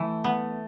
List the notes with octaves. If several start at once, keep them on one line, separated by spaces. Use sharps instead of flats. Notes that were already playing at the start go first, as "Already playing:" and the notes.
Already playing: E3 A3
B3